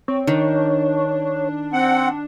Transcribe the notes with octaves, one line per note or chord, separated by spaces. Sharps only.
C4 C#5
D#3 D4
C4 F#5